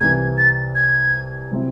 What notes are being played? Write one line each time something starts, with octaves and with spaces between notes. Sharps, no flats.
C2 C3 E3 G#6
A6
G#6
C3 F#3 C4 E4